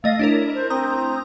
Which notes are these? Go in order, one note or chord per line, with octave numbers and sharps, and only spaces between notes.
A3 D#5 F5 A#6
D4 E4 A#4 C#5
C5
C4 A#5 D#6 G6